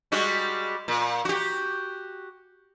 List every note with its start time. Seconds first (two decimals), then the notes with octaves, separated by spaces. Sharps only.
0.12 G3 G#3 F#4
0.88 A#2
1.25 F#4 G4